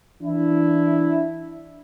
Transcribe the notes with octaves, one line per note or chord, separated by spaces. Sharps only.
E3 D4 E4